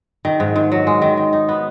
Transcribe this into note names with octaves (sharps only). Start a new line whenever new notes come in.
D#3
G#2
G#2
F#3
G#3
D#3
D#3
D#4
B3